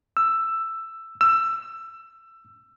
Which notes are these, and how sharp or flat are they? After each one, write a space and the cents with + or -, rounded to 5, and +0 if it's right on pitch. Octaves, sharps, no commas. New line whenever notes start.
E6 +10
E6 +20